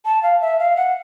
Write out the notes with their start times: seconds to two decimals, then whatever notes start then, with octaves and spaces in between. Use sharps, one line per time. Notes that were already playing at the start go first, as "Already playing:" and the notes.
0.05 A5
0.23 F5
0.41 E5
0.59 F5
0.77 F#5